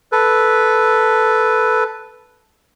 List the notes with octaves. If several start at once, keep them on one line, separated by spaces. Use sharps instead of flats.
A4 B4